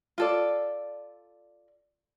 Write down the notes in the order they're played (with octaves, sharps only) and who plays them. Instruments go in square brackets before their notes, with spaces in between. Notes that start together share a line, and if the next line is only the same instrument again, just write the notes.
[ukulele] F4 A4 D5